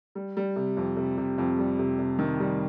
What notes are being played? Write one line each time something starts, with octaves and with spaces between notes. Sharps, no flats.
G3
G3
C3
F2
C3
C3
F2
G3
C3
C3
D#3
G3